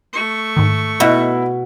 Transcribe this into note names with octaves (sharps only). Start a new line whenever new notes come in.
A3 C#6
G#2 D#3
B2 B3 E4 F#4